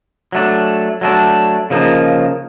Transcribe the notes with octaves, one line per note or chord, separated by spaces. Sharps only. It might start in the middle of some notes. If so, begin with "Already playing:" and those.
F#3 A3 D4
F#3 A3 D4
C#3 F3 A#3 D#4